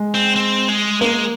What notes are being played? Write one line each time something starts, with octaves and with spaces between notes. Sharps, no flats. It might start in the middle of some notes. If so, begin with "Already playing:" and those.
Already playing: G#3
C4
C4
G#3
G#3 A#3